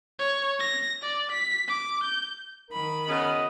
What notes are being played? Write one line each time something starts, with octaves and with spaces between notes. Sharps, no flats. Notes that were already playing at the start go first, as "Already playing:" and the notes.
C#5
A#6
D5
B6
D6
G6
D#3 A#4 B5
F#2 C#3 B3 D#5